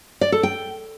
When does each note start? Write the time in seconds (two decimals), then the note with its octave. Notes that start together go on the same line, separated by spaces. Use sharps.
0.21 D5
0.32 A4
0.43 G5